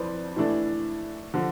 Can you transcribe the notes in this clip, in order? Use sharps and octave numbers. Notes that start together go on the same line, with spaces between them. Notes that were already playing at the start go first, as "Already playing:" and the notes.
Already playing: F2 E3 B4 C5 D5
E3 A3 D4
D3 F3